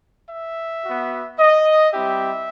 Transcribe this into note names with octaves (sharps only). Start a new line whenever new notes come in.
E5
B3 F#4
D#5
G3 C4 E4 G4 E5